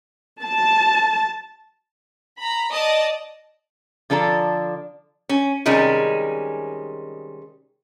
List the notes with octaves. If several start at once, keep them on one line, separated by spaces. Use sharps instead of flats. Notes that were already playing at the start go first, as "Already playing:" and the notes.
A5
A#5 B5
D5 D#5 A5 D#6
D3 F3 D4 A4 A#5
C#4
C3 D#3 G3 G#3 C#4